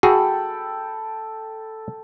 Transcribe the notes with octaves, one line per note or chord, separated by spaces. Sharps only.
F#4 G#4 A4 G5 B5